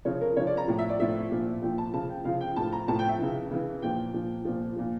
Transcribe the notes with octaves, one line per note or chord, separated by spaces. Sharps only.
C#3 F3 C#5
A#4
C#3 F3 C#5
D5
A#5
A2 F3
E5
D5
A2 F3 E5
A#2 F3
A#2 F3 G5
A5
C#3 F3 A5
G5
C#3 F3 F5
G5
A2 F3 A5
A#5
A2 F3 A5
G5
E5
C#3 E3
C#3 E3
A#2 F3 G5
A#2 F3
A#2 F3
A#2 F3